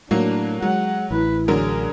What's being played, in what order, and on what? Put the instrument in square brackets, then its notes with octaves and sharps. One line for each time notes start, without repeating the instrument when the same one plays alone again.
[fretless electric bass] A2 [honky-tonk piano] F#3 A#3 [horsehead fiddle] D4
[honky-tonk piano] F#3 [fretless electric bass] G#3 [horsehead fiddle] F#5
[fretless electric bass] A1 [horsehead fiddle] E4 B4
[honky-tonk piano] D3 F#3 A#4 [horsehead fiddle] G#4